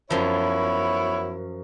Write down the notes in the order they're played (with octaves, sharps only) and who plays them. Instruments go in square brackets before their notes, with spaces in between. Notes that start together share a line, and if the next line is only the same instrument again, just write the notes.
[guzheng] F#2 F3 [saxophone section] B3 E4 C#5